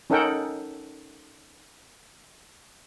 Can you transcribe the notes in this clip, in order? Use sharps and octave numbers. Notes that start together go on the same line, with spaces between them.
C#4 D#4 A4 A#4 F#5 G5